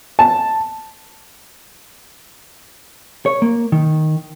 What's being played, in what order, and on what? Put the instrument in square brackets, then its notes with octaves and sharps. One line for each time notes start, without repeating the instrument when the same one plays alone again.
[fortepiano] A5
[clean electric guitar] C#5
A#3
D#3